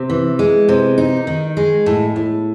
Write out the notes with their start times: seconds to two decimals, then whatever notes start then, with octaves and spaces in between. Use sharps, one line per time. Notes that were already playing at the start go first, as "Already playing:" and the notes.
Already playing: C3
0.10 E3
0.39 G#3
0.69 C3
0.98 D#4
1.27 D#3
1.57 G#3
1.86 A2
2.16 A2